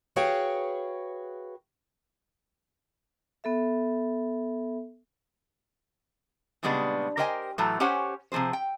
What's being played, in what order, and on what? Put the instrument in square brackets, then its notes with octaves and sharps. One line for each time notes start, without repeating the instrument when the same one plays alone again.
[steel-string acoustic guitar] F#4 G#4 B4 C#5 F5 G5
[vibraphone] B3 A4 E5
[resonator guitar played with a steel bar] A#2 C#3 G3 G#3 B3 D4
G4 A#4 C5 D#5 G5 G#5
A2 E3 F#3 A3
C#4 G4 C5 C#5 F#5 G#5
C3 F3 A3 G#4 C5
G5